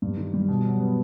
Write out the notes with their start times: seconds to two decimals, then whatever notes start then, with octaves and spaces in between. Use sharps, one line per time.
0.02 G2
0.17 D#3
0.34 G3
0.48 B2
0.65 F#3
0.80 B3